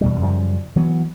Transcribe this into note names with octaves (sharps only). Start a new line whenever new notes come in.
E2 B2 G3
F#2 C#3 F3 G3
E3 F#3 B3